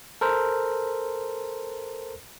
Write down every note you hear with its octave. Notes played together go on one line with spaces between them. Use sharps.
A4 A#4 C5